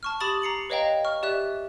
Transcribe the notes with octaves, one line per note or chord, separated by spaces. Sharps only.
A5 C#6 F6
G4 B5 D6 D#6 A6 F#7
A#5 C7 C#7 F#7
B4 C#5 D#5 F5 G5 A#5
C#6 F6
G4 D5 E5 F#6